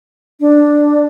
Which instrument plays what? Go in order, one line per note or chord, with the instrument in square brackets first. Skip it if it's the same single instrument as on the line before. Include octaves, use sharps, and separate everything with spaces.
[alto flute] D4